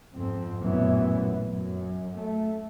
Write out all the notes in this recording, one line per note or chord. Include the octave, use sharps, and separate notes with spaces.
F2 G#2 C4
A1 F#2 A#2 E3 B3
F#2
A3